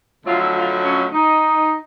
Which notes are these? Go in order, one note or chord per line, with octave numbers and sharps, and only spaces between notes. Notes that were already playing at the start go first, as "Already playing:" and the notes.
F2 D3 F#3 A3 F4
E4
F4
C#4
D#4